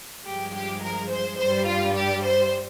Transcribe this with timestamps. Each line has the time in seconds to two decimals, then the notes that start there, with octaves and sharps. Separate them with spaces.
0.25 G2 F3 G#3 G4
0.53 G4
0.82 A#4
1.10 C5
1.38 G2 G3 C5
1.66 F4
1.94 G4
2.23 C5